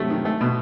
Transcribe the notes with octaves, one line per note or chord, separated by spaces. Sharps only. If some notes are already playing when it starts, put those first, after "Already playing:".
Already playing: C3 F#3 A3
D#3
A3
B2